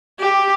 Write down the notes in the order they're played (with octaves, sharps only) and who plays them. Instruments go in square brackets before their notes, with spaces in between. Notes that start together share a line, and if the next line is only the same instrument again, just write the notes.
[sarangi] G4